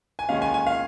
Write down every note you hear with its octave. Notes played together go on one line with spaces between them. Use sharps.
G#5
D#2 D#3 G#3 C#4 F5
G#5
G#5
F5